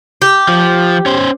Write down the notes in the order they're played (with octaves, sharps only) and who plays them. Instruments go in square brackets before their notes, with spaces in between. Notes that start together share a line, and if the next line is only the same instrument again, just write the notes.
[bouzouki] G4
[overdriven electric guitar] F3
C#4 C5